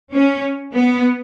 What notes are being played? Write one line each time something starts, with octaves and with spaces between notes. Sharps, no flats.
C#4
B3